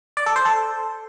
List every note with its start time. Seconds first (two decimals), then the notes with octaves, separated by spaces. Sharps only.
0.17 D5
0.26 A4
0.36 C5
0.45 A4